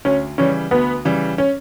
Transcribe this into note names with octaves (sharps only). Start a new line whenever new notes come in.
D2 C#4
C#3 E3 G3 C#4
D2 B3
C#3 E3 G3
C#4